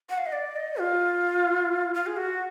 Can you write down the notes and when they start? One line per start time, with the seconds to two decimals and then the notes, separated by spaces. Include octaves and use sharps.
0.10 F#5
0.18 F5
0.26 D#5
0.32 D5
0.56 D#5
0.79 F4
1.94 F4
2.07 G#4
2.17 F#4